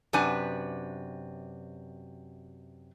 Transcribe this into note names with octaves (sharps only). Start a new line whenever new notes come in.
F#2 C3 D4 B4 G#5